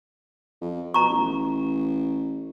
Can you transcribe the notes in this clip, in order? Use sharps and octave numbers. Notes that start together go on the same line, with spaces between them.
F2
B2 A#5 C#6
A1